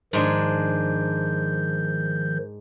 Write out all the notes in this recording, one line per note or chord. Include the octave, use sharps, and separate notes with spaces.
G#2 D#3 F3 G#3 D4 G6